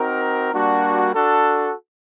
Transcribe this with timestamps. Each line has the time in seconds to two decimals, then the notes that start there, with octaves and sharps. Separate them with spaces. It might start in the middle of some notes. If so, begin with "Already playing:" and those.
Already playing: C4 D#4 F#4 A#4
0.52 G3 A#3 D4 F#4
1.13 D4 F#4 A4